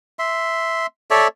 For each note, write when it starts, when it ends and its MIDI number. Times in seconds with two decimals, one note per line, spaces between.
0.19 0.86 76
0.19 0.86 84
1.11 1.28 69
1.11 1.28 73
1.11 1.28 74
1.11 1.28 76